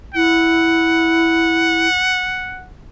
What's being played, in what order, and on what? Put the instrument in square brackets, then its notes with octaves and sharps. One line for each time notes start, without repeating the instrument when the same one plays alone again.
[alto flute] E4 [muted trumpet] F#5